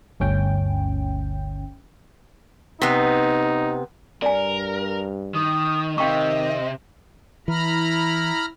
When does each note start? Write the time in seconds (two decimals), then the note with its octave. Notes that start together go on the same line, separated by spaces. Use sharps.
0.20 G1 D2 C#4 G5
2.82 C3 B3 D#4
4.22 G2 A#4 D5 G#5
5.34 D#3 D#6
5.98 C3 D#3 D#5 F5 G5 C#6
7.48 E3 E4 A#5 B5 F6